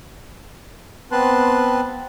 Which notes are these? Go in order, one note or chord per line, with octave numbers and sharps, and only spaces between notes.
B3 C4 B4 A5 C6 F#6